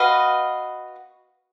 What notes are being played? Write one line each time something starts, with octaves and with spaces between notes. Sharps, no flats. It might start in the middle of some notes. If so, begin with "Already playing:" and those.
Already playing: F#4 B4 D#5 F5